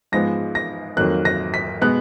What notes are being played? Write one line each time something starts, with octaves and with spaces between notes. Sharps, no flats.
G#2 F3 G#3 B3 A#6
A#6
F2 D#3 F#3 A#3 F#6
A#6
B6
B2 G#3 B3 F#6